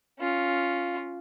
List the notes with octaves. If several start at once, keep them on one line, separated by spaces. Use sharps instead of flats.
C#4 F4